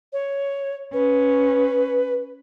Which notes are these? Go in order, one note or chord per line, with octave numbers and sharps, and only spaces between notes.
C#5
C#4 B4